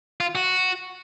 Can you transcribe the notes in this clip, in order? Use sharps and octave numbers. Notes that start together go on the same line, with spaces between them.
F4
F#4